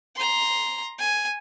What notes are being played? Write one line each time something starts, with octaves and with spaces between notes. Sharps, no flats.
A#5 C6
G#5